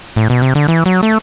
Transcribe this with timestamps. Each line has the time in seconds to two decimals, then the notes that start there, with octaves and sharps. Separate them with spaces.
0.16 A2
0.30 B2
0.42 C3
0.55 D3
0.68 E3
0.86 F#3
1.03 A3